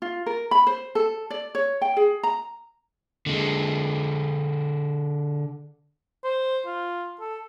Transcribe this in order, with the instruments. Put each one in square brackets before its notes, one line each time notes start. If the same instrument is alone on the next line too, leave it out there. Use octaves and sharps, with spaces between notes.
[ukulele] F4
A#4
B5
C5
A4
D5
C#5
G5
G#4
A#5
[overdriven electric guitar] D3 G#3
[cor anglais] C5
F4
A4